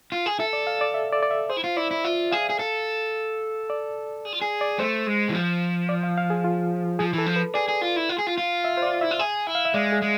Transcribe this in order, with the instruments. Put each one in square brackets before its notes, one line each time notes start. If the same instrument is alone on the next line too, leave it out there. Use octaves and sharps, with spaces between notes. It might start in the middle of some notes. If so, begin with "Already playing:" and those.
[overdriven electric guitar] F4
G#4
[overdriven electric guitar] A4 [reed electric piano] E5
[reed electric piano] D5
F5
D5
E5
D5
D5
E5
[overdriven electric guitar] G#4 [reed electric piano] C5
[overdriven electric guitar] E4
F4
[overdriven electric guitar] E4 [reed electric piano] D5
[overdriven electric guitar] E4
[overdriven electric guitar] F4 [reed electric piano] E5
[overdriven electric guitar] G#4 [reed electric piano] F5
[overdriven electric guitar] G#4
A4
[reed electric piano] D5
[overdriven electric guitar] G#4
F4
G#4
[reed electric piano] D5
[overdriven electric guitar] A3 [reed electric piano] C5
[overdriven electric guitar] G#3
E3
F3
[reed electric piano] D5
F5
F5
G#4
F4
[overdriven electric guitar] F3 [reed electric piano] G#4
[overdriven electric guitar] E3
[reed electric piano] A4
[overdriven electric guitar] F3
[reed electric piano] B4
[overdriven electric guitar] G#4 [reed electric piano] D5
[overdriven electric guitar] G#4
F4
E4
F4
G#4
F4
F4
[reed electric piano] E5
C5
D5
[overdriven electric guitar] E4 [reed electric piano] E5
[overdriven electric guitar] F4
G#4
E4
[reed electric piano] F5
E5
[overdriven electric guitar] G#3 [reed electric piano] D5
[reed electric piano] G#4
[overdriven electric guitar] G#3